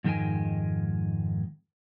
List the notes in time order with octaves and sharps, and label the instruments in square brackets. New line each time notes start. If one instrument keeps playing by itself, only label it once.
[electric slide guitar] F2 G#2 D#3 G#3 G5 G#5